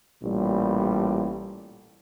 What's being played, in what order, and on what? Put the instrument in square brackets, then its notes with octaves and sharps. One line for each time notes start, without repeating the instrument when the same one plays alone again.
[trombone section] A1 A#2 G3